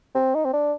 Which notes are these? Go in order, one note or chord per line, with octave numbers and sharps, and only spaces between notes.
C4
D#4
C4
D4